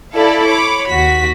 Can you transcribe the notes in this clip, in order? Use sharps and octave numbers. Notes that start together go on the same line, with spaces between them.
E4 A4 D5 F5 B5
C#5 B5 D6
D#2 F#4 B6